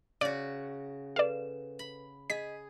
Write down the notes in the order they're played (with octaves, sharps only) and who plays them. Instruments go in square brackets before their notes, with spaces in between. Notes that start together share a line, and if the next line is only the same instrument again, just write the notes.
[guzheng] C#3 F#4 [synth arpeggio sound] D5
[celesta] A4 B4 E7 [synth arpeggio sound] D5 F5
[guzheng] B5
[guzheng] G#4 [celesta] D#5 [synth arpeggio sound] B6